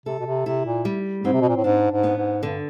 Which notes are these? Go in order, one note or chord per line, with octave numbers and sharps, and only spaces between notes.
C3 A4
B2
C3
C3 E4
A#2
G3
G#2 C4
C3
B2
A#2
A2
G#2 D4
G#2
B3
G#2
G2 D3